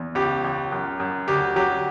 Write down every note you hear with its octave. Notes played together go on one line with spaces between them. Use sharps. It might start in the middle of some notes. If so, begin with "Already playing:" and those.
Already playing: E2
C#2 G4
C#2
F#2
F#2
D2 G4
F#3 G4